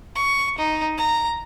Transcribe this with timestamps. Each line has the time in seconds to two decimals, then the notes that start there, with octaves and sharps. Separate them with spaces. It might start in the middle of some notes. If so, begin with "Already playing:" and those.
0.15 C#6
0.58 D#4
0.97 A#5